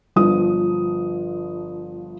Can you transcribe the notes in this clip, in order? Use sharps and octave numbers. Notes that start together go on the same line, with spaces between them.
G1 F3 D#6